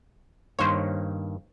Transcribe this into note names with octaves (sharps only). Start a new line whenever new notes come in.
G2 D#3 A#3 C5 C#5